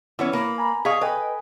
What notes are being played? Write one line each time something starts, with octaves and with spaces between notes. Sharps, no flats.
E3 B3 C#4 E4 C#5
A#3 B5
G#5 A#5
G#4 D#5 F5 C#6 D#6 B6
A4 B4 D#5 G5 G#5